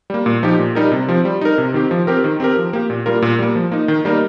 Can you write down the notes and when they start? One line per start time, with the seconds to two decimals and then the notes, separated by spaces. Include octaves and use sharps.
0.10 G3 A#3
0.26 A#2
0.43 F3 D#4 G4
0.59 A#2
0.75 G3 D#4 A#4
0.92 C3
1.08 F3 C4
1.25 G3
1.41 D#4 A#4
1.58 C3
1.74 D#3 C4 G4
1.91 F3
2.07 C4 G4 A#4
2.24 D#3
2.40 C4 G4 A#4
2.57 F3
2.73 A#3 G4
2.90 A#2
3.06 G3 A#3 F4 A#4
3.22 A#2
3.39 G3 A#3
3.55 F3
3.72 A#3 D#4
3.88 D#3
4.05 G3 A#3 D#4 A#4